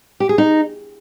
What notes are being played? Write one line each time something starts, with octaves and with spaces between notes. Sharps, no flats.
G4
G#4
D#4